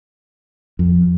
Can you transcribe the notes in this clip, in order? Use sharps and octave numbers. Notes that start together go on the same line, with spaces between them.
F2